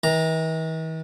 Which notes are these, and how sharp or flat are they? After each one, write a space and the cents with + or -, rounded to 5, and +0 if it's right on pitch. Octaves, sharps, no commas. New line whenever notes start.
E3 -45 A#5 +0